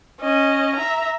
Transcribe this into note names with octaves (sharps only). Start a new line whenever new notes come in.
C#4 D#5
E5 A#5